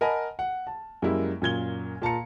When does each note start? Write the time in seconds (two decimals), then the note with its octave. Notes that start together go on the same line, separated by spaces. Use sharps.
0.01 A#4 D#5 F#5 G#5 A5 B5
0.39 F#5
0.67 A5
1.02 F#2 G3 G#3 A#3 E4
1.42 F#2 A#2 G#6 G7
2.02 A#2 A5 A#5 C#7